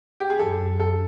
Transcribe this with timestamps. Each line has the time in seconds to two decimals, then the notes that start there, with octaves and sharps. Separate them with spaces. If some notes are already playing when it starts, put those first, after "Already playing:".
0.20 G4
0.30 G#4
0.39 F#2 A4
0.80 A4